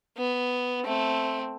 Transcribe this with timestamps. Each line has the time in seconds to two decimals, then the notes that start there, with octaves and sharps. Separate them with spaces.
0.17 B3
0.85 A3 C4